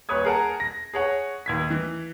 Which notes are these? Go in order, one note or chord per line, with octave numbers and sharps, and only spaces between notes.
D#1 B4 C#5 D#6 G#6
G#4 A#4 F#5 A5
A#6
G#4 C#5 F#5
D#2 G#6 B6
E3